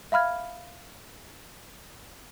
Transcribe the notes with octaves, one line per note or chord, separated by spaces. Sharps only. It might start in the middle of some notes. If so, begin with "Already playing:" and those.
E5 F5 B5 F6 G#6